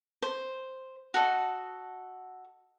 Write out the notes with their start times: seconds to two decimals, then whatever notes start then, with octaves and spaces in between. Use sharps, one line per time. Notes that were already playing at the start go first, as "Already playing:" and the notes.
0.22 C5
1.14 F#4 A4 D#5